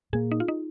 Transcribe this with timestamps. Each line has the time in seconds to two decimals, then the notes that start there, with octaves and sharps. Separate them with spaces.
0.13 A#2 A#3 G#4
0.31 D#4
0.40 F4
0.48 D#4